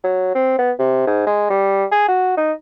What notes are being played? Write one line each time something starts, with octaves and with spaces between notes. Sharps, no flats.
F#3
C4
B3
C3
G#2
G#3
G3
G#4
F#4
D#4